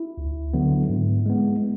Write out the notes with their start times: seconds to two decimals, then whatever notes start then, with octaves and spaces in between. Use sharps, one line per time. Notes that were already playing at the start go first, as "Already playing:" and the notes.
Already playing: E4
0.18 D2
0.53 D3 F#3 B3
0.89 G#2
1.26 G#3 B3